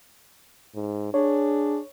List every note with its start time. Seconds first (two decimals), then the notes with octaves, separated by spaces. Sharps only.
0.75 G#2
1.14 D4 G#4 C#5